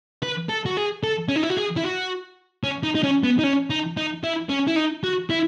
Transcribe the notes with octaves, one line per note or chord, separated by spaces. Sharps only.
B4
A4
F#4
G#4
A4
C#4
D#4
E4
F#4
G#4
E4
F#4
C#4
D#4
D#4
C#4
B3
D#4
C#4
D#4
D#4
E4
C#4
E4
D#4
F#4
E4